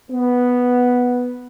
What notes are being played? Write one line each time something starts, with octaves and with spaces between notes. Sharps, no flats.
B3